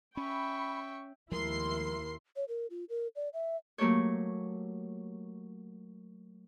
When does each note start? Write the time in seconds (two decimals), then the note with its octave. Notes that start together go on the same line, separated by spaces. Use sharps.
0.17 C#4 E5 G5 B5 C#6
1.31 D#2 F3 G#3 A3 E4 A#4 C6 C7
2.36 C#5
2.48 A#4
2.70 F4
2.90 A#4
3.16 D5
3.33 E5
3.78 F#3 A3 A#3 G4 A4 C#5